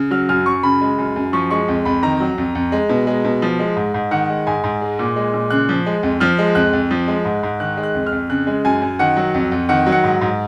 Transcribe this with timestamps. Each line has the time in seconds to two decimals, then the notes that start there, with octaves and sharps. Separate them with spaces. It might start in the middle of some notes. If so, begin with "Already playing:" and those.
Already playing: C#3
0.11 F#3 F6
0.29 F#2 F6
0.46 F#2 C#6
0.63 C#3 B5
0.81 G#3
0.98 F#2
1.16 F#2
1.33 F3 C#6
1.50 G#3 C#6
1.68 F2
1.85 F2 B5
2.03 D#3 A#5
2.20 F#3
2.38 F2
2.55 F2
2.72 G#3
2.89 B2
3.07 G#3
3.24 B2
3.42 F3
3.59 G#3
3.76 G#2
3.94 G#2
4.11 D#3 F#5
4.30 G#3
4.47 G#2 G#5
4.64 G#2
4.82 G#3
4.99 A#2
5.16 G#3
5.34 A#2
5.50 C#3 F#6
5.69 F3
5.86 G#3
6.03 F2
6.20 F3 F6
6.38 G#3
6.55 F2 F#6
6.73 F2
6.91 F3
7.08 G#3
7.25 G#2
7.43 G#2
7.60 D#3 F#6
7.77 G#3
7.83 F#6
7.95 F2
8.06 F6
8.12 F2
8.30 C#3 F#6
8.47 G#3
8.65 F#2 G#5
8.82 F#2
8.99 D#3 F#5
9.17 F#3
9.34 F2
9.52 F2
9.69 D#3 F#5
9.86 F#3
9.92 F#5
10.04 G#2
10.21 G#2